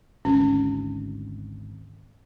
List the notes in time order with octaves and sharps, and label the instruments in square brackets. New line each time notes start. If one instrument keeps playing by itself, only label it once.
[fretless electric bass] G#1 D2 [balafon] C#4